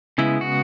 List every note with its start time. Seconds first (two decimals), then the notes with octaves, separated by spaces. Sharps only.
0.18 C#3 G#3 B3 E4
0.41 F#4